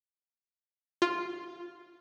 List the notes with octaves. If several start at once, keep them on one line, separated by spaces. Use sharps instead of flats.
F4